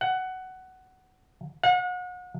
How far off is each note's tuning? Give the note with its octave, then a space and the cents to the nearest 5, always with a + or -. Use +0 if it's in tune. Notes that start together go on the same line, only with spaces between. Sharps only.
F#5 +15
F#5 -35